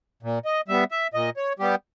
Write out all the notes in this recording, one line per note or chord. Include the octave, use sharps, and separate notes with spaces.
A#2
D#5
G3 B3 E5
E5
A#2 D#5
C#5
G3 B3 G4